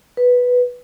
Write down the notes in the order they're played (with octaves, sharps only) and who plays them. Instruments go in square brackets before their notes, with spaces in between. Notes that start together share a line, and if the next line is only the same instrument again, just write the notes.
[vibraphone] B4